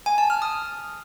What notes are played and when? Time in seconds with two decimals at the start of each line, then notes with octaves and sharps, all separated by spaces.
0.06 G#5
0.18 A5
0.30 F6
0.42 D#6